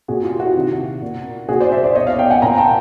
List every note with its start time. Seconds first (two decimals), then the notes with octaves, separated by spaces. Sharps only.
0.08 A#2 F#4 G#4
0.24 F4 G4
0.39 E4 F#4
0.55 C3 D#3
1.02 A#2
1.49 A#2 F#4 G#4
1.60 C5 D5
1.72 D5 E5
1.84 C5 D5
1.95 B2 C#5 D#5
2.07 D#5 F5
2.19 F5 G5
2.30 F#5 G#5
2.42 A#2 G#5 A#5
2.58 G5 A5